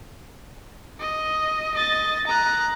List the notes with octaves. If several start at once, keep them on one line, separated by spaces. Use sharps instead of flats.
D#5
D#5 A6
A#5 F#6